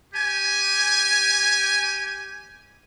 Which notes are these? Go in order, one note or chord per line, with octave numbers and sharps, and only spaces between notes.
G4 G#5